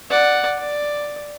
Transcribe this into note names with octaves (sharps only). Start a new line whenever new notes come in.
D5 F#5
D5